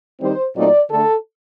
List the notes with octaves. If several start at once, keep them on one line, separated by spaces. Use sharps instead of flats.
D#3 G3 C4 D#4 C5
A#2 F#3 A3 C4 D#4 D5
D3 A3 D4 A4